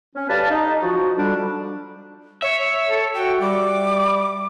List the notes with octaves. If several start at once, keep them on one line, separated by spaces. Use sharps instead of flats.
C#4
D2 G3 B4 D5 F5 A5
D#4
F3 F#4
D3 G3 D4
C#5 E5
A4
F#4 G5
G3 D6